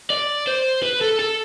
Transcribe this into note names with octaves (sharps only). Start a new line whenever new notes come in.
D5
C5
B4
A4
A4